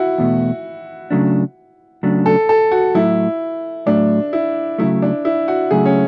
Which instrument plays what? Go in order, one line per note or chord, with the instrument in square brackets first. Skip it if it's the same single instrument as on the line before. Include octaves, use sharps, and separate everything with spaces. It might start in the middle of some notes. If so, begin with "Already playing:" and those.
Already playing: [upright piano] E4 F#4
[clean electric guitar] E2 B2 A3
C#3 F#3 A3 D4
C#3 F#3 A3 D4
[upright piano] A4
A4
F#4
[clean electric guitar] A2 F#3 A3 [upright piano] E4
[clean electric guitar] A2 F#3 A3 [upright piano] D4
[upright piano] E4
[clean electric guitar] C#3 F#3 A3 [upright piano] E4
[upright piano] D4
E4
F#4
[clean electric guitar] C#3 F#3 A3 [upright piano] G#4
[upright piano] C#4